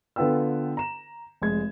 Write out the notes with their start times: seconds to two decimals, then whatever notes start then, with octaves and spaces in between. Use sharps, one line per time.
0.16 D3 B3 F4 B4 G5 E6
0.77 A#5 E7
1.42 F1 G#3 G#6